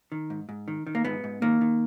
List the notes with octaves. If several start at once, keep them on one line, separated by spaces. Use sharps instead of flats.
D#3
G#2
G#2
D#3
D#3
A#3
G#2 B3
G#2
D#3 A#3
D#3